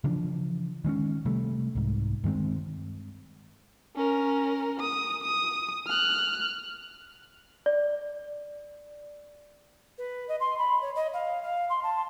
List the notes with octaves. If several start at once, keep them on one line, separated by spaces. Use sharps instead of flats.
C#3 E3 F3 D4
D#3 G#3 C4 C#4
C3 G3 A3
C2 G#2
G2 D#3 G#3 C4
C#4 A#4
D#6
D#6
F6 F#6
D5
B4
D#5
C6
B5
C#5
D#5
F5
F5
C6
A5